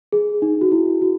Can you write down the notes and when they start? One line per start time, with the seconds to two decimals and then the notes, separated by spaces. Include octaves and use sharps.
0.12 G#4
0.42 D#4
0.61 F#4
0.72 E4
1.02 F#4